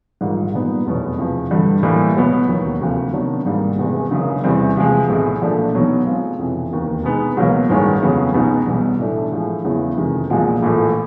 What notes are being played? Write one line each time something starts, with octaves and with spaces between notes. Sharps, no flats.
A#1 G#2 D#3 G3 A#3
A#2 G3 B3 D#4
F1 E2 B2 F#3 B3
E2 C3 F3
G2 D3 G3
A2 E3 G3 A#3
C#2 B2 F#3 B3
D#2 D#3 F#3
D2 C3 F3 A#3
C3 D#3 F#3 B3 D4
G#2 D#3 G3 A#3
E1 E2 C3 E3 G#3
F#1 F#2 C#3
E2 C3 E3 G3 C4
C3 F3 G#3
B1 A2 E3 G#3
A#2 F3 A3 D4
B2 F#3 B3 D#4
B2 G#3 C4 F4 G#4
F2 C3 E3
E1 D#2 D#3
B2 G#3 B3 D#4
C#2 B2 F#3 A#3
A1 G2 D#3 G#3 C#4
F2 C#3 F#3 B3
C#2 B2 G#3 B3 D#4
B1 B2 G3
A2 E3 A3 D4
A2 F3 G#3
E2 C#3 F#3 B3 E4
F2 C3 D#3 G#3
B1 A#2 F3 G#3
A#1 A2 E3 A3